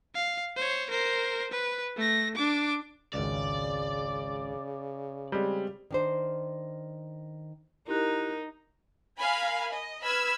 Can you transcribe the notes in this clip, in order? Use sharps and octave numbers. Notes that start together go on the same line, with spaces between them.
F5
C5 C#5
A#4 C5
B4
A3 A#6
D4 D6
G#1 C#2 C#3 D5
G3 G#3 C4
D#3 D4 C5
D#4 E4 G4 A#4 F#6
A#4 F5 G#5 B5
D#5
B4 B5 E6 F6 G#6 B6